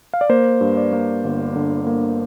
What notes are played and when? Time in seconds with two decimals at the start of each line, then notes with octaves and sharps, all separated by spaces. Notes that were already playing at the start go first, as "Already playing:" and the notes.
0.13 F5
0.21 D5
0.29 A#3 C5
0.61 G2
0.77 D5
0.93 A#3
1.24 G1
1.56 D3
1.87 A#3